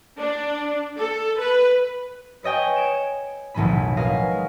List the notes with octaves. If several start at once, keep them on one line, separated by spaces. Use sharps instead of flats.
D4
A4
B4
B4 C#5 D#5 G5 G#5
G#6 C#7 D7 E7
F1 B1 A2 D#3 C#4 B5
F#4 A#4 B4 D#5 F5 G#5
G#3